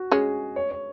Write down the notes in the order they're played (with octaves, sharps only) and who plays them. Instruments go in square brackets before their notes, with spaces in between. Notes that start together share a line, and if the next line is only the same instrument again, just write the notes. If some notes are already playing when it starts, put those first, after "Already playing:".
Already playing: [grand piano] F#4
[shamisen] G#3 C#4 [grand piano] G#4
[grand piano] C#5
C#5